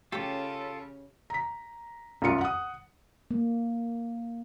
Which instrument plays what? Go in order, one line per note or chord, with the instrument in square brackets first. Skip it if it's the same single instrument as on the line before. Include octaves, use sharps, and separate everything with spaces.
[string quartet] C#3 C#4 [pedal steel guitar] F4 A4 [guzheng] G4 C#5
[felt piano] A#5 B6
C2 F#2 F4 C#7
F#5 D#6
[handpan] A#3